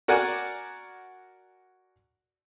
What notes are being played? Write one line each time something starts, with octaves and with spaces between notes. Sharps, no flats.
F#4 A#4 D5 F#5 G#5